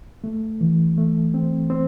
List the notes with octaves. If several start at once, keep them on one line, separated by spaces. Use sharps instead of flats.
A3
E3
A3
C4
C4